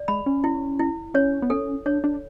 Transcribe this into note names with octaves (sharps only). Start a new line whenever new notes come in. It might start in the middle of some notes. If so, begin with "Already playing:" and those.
Already playing: D5
G#3 B5
C#4
E4
E4
C#4 C#5
B3
C#4 A4
D4 C#5
D4